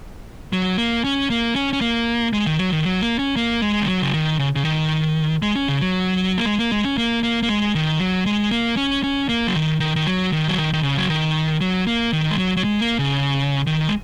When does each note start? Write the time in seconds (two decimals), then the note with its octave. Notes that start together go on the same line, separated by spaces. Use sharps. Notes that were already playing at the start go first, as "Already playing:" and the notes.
0.53 F#3
0.78 A#3
1.04 C#4
1.30 A#3
1.56 C#4
1.73 C#4
1.81 A#3
2.33 G#3
2.46 D#3
2.59 F#3
2.72 D#3
2.85 F#3
3.02 A#3
3.19 C#4
3.36 A#3
3.62 G#3
3.82 D#3
3.88 F#3
4.02 C#3
4.14 D#3
4.39 C#3
4.56 C#3
4.65 D#3
5.42 G#3
5.56 C#4
5.68 C#3
5.81 F#3
6.38 A#3
6.45 G#3
6.59 A#3
6.72 G#3
6.84 C#4
6.98 A#3
7.23 A#3
7.43 A#3
7.49 G#3
7.75 D#3
8.00 F#3
8.26 G#3
8.51 A#3
8.77 C#4
9.03 C#4
9.29 A#3
9.47 F#3
9.55 D#3
9.80 D#3
9.96 D#3
10.07 F#3
10.32 D#3
10.48 F#3
10.58 D#3
10.73 D#3
10.83 C#3
10.97 F#3
11.10 D#3
11.61 F#3
11.87 A#3
12.13 D#3
12.31 G#3
12.38 F#3
12.57 F#3
12.64 G#3
12.81 A#3
12.99 C#3
13.67 D#3
13.88 G#3